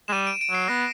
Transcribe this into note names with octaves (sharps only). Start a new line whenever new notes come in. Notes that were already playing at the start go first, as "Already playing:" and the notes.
G#3 E7
G3 D#7
D7
D7
F#3 C7
B3 A#6